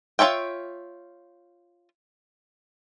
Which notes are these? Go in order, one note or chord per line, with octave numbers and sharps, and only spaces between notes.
F4 A4 C#5 E5 G5